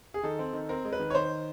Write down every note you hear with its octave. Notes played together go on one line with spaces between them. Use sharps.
G#4
D#3 A4
C4
D#3
C4 A#4
G#3
B4
D#3
C#5
D#3 C5